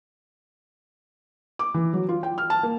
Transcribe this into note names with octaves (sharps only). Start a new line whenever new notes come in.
D6
E3
F#3
F4
G5
F6
A5
A#3